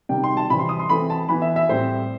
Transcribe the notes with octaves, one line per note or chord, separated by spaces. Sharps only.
C3 D#3 G3 G5
C6
A5
C3 E3 G3 C4 B5
C6
D#6
C6
E3 A3 C4 B5
A5
E3 B3 B5
E5
E5
A2 G3 C4 C5